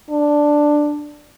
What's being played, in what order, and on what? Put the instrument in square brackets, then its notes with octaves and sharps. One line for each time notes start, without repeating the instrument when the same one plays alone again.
[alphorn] D4